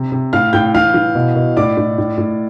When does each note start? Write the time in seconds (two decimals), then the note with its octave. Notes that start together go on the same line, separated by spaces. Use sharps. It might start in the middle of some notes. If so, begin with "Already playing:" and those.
Already playing: C3
0.12 C3
0.33 A2 F5 F6
0.53 A2 G5 G6
0.74 E3 F5 F6
0.94 E3
1.15 B2
1.36 B2
1.57 A2 D5 D6
1.77 A2
1.98 A2
2.18 A2